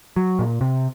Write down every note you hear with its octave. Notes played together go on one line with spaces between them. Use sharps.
F#3
A#2
C3